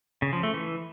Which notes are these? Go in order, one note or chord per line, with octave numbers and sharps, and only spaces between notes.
C#3
F3
A3
E3